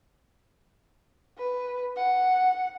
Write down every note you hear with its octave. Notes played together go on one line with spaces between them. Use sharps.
B4
F#5